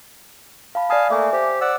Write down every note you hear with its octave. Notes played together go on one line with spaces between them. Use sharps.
F5 A5 B5
D5 F5 G#5 A5 D#6
A3 A#3 E5 G#5
G4 C5
D5 F#5 E6